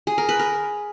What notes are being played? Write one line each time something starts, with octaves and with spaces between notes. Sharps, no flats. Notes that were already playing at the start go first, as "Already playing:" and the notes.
G#4
A#4
B4
A#4